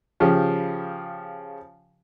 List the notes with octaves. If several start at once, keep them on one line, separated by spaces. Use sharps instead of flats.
C#3 F3 G4